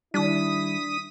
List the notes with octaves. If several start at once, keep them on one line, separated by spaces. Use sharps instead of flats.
D#3 G3 D4 E4 D#6 B6 D#7